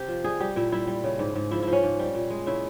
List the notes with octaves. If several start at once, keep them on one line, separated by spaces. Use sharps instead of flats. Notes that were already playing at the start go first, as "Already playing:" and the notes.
Already playing: C3 C4 G4
F3
G3 G#4
G3 G4
A#2 E4
G3 E4
G3
C#3
G#2
G#2
F3 E4
F3 E4
C#4
G#2
G3
A#2
G#3
C#3 E4